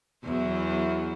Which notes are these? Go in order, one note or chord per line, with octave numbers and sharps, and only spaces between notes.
E2 E3 F#3